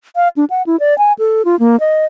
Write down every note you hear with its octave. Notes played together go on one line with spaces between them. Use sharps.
F5
D4
F#5
E4
D5
G#5
A4
F4
A#3
D#5